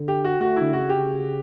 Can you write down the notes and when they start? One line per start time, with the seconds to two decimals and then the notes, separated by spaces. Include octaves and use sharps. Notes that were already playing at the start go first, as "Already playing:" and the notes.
Already playing: D3
0.08 G4
0.24 F#4
0.40 A3 F#4
0.56 D3 E4
0.72 C#3 F#4
0.89 G4